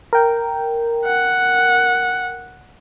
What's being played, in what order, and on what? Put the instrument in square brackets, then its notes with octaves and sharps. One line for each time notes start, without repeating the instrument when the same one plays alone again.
[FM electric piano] A#4 G5
[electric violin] F#5